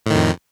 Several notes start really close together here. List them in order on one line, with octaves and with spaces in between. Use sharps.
A2 D#3 F2